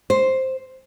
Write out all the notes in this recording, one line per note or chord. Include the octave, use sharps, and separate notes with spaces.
C5